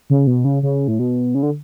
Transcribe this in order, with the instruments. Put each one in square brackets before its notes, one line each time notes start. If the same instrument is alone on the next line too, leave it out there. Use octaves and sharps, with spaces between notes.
[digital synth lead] C#3
B2
C#3
C#3
A2
B2
C#3
D3